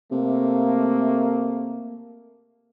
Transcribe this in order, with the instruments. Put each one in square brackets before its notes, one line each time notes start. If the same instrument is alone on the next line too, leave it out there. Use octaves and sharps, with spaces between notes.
[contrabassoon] C3 [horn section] A3 A#3